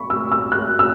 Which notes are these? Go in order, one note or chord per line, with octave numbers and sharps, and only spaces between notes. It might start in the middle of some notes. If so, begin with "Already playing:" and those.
Already playing: B5 C#6
E6
E6
F#6
E6